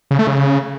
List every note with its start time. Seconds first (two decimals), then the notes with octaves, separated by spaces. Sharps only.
0.11 C#3
0.19 A3
0.27 C#3